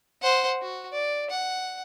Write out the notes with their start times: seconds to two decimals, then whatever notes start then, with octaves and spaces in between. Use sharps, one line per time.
0.22 C5 F#5
0.62 F#4
0.93 D5
1.30 F#5